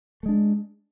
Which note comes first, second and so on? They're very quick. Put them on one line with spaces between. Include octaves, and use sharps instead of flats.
A3 G#3 D4